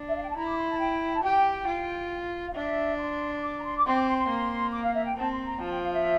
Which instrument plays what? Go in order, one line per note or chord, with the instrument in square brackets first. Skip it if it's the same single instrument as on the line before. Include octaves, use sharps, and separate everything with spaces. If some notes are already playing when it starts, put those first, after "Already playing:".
Already playing: [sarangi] D4
[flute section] E5
F5
G5
A5
[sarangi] E4 [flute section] A#5
[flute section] D6
C6
A5
G5
A5
[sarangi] G4 [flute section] G5
[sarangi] F4
[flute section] F5
[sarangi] D4 [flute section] E5
[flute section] C6
D6
A#5
C6
D6
[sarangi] C4 [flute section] C6
[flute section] D6
C6
C6
[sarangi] A#3
[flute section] D6
F5
E5
G5
[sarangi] C4 [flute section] A5
[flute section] C6
A#5
[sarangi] F3 [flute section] A5
[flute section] G5
F5
E5